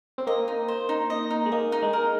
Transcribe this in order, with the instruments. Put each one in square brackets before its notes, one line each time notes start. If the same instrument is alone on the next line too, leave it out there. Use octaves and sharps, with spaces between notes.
[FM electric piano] C4
[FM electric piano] A#3 [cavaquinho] D#5
[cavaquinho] D#4
C5
D#4
D#5
D#4
[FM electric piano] G#3
[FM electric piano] A#3 [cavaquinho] D#5
[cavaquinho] D#4
[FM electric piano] G#3
[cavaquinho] A#4